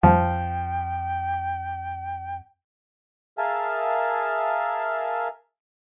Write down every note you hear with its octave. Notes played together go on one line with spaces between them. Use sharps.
F2 F3 G5
G#4 A#4 E5 F5 G#5 A5